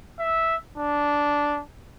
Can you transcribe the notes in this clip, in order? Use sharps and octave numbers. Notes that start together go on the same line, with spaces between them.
E5
D4